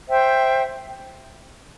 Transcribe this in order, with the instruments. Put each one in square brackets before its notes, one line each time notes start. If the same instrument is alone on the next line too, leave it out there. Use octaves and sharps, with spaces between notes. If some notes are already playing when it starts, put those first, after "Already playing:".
[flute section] C5 E5 G5